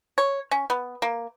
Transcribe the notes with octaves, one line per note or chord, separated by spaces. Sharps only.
C#5
C#4
B3
A#3